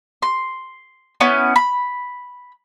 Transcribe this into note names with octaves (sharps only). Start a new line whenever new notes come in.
C6
B3 C#4 E4
B5